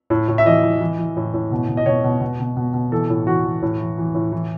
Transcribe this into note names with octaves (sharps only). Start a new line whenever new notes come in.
A2
A2
E5
E3 D#5
E3
E3
E3
A2
A2
B2
B2
D#5
B2 C#5
B2
B2
B2
B2
B2
E3 A4
A2
E3 F#4
E3
A2
E3
E3
A2
E3